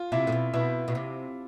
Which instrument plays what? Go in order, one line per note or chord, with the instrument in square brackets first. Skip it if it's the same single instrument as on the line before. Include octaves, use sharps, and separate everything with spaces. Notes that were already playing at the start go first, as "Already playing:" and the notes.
Already playing: [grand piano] F4
[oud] C3 [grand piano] E4 E5
[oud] A2
B2
[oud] B2 [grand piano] E4 E5
[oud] B2
C3